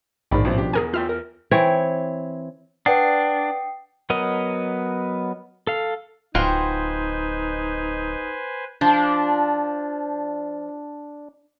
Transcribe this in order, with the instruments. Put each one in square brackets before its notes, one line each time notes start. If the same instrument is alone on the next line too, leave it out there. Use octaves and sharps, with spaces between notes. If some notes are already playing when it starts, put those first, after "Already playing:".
[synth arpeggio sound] A#1 G#2 [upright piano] D#3 D5 B5
[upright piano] A1 C4 [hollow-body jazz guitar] B2 F3
[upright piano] D4 G4
[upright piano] E2 [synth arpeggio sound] G#4 A#4 G#5
[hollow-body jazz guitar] F4 E5 G5 [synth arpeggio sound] F6
[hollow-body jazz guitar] A#4
[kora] E3 C4 C#5
[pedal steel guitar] D4 [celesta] B4 D5 F#5 [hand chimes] G5 D#6 C7
[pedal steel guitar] F#3 B3 A#4 D#5
A4 F5
[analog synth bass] D1 [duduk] D#4 [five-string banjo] F4 F#4 G5 [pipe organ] B4 C5 G#5
[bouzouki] F3 [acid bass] D4